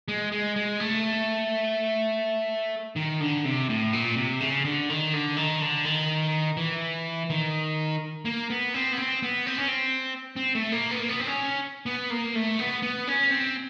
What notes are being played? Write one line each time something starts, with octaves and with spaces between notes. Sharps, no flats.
G#3
G#3
G#3
A3
D#3
D3
C3
A2
A#2
C3
C#3
D3
D#3
D3
D#3
D3
D#3
E3
D#3
A#3
B3
C4
B3
C4
B3
C4
C#4
C4
C4
A3
A#3
B3
A#3
B3
C4
C#4
B3
A#3
A3
B3
B3
C#4
C4